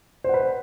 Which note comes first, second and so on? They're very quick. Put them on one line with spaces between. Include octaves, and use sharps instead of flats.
C5 F#5 B4